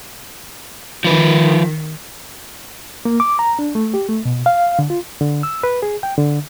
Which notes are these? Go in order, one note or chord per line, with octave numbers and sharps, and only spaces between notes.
D#3 F3 B4
A#3
D6
A#5
D4
A3
G4
A3
B2
F5
D3
F4
D3
E6
B4
G#4
G5
D3